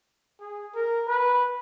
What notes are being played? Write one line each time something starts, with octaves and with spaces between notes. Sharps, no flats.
G#4
A#4
B4